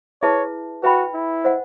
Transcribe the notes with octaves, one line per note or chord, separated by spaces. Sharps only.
E4 G#4 B4 C#5 E5 A5
F#4 B4 E5 G5 B5
E4
C5 D#5 F#5